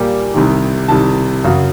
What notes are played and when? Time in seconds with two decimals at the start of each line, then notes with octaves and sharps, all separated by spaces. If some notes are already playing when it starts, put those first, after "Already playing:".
Already playing: A#2 G3 A#3 G#5
0.34 C2 C3 D#3
0.88 C2 C3 D#3 A5
1.44 F#2 C#3 F#3